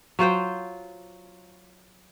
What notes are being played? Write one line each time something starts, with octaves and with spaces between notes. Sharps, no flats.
F#3 F4 C5 G5